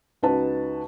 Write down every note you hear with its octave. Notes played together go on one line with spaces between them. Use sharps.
C#2 D#4 F#4 B4 A5